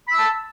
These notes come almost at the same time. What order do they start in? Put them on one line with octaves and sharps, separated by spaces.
B5 E6 A5